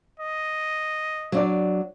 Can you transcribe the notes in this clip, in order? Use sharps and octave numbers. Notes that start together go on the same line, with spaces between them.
D#5
F#3 D4 D5